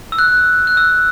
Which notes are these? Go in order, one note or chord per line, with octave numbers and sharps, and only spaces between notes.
E6
F#6
F#6
E6